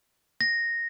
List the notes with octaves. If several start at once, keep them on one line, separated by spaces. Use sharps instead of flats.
A#6